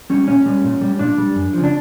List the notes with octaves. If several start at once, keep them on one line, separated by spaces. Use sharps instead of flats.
G3 C#4
A#2 C#4
G3
A#2
G3
A#2 D4
G3
F#2
C#3 F3
D4